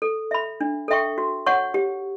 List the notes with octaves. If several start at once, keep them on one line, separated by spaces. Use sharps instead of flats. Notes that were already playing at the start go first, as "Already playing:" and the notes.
A4
E5 B5
D4
A4 E5 G5 C#6
F#4
C#5 F#5 C#6
G4